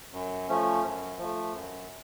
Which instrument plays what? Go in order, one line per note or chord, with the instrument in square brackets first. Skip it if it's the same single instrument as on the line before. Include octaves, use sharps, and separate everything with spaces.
[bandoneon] F#2
F3 A3 C#4
F#2
F3 A3
F#2